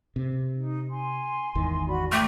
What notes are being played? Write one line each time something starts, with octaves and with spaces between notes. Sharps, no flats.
C3
D#4
G#5 C6
G#1 E2 D#3
F#4 D5 B5
A3 G5 A#5 D6